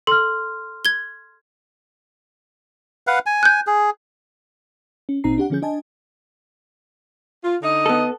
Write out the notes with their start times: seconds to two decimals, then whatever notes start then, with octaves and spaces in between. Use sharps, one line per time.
0.07 A4 C6 F6
0.85 G#6 G7
3.07 B4 F5 F#5
3.26 G#5
3.43 F#6 G6
3.67 G#4
5.09 C#4
5.24 G#1 A#2 C4 D#4 A#5 C7
5.38 D4 G4 F#5
5.50 D3 F3 C#4 G#4 G6
5.62 D4 D#5 G#5 A5
7.44 F4
7.62 D3 D#4 D#5
7.86 B3 A4